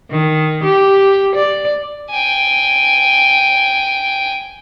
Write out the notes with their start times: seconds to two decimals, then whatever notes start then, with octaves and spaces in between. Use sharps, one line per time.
0.11 D#3
0.64 G4
1.36 D5
2.10 G5 G#5